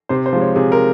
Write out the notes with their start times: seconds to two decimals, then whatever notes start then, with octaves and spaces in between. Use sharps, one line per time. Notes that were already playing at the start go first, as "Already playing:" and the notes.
0.09 C3 C5
0.26 C5
0.33 F3 G#3
0.41 C#5
0.56 C3 G#4
0.72 A#4